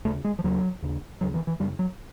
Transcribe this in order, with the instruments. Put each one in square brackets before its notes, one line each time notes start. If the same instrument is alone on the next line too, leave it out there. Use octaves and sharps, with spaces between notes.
[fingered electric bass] D#2 C#3 A3
G#3
F3
D#2 C#3 F#3
D#2 C#3
D#2 C#3 F#3
E3
E3
F#2 C#3 G3
F#3